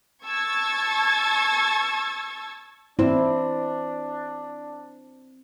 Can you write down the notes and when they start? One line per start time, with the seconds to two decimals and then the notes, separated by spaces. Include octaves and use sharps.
0.24 A5 C#6 E6 G#6 A6
2.99 C4 D4 E4